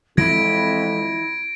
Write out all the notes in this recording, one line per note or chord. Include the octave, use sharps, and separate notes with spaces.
F2 E3 G#3 C4 E4 G#6 A#6 D7